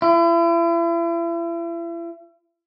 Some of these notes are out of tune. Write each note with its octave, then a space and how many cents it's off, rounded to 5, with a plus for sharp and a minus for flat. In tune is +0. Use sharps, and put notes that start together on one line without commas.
E4 +40